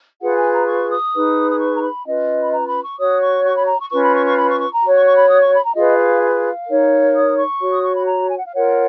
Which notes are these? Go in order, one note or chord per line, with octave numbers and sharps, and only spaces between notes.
F4 G#4 B4 F#5
G#5
A#5
C#6
D#6
D#4 G#4 B4
D#6
C#6
A#5
B5
C#4 F4 B4 D#5
B5
A#5
B5
C#6
F#4 C#5 D#6
C#6
C#6
B5
A#5
C#6
C#4 F4 B4 C#6
B5
C#6
C#6
B5
C#6
C#6
A#5
F#4 C#5
C#6
C#6
B5
D#6
C#6
B5
A#5
F4 G#4 B4 D#5
F5
F5
D#4 A#4 C#5
D#6
C#6
F#4 C#5
D#6
C#6
B5
A#5
G#5
F#5
F5
F4 A#4 C#5 F#5